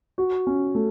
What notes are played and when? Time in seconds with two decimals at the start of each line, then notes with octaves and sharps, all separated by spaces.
0.18 F#4
0.47 C#4
0.75 A3